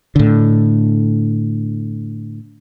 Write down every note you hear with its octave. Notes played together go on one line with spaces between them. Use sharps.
A2 D3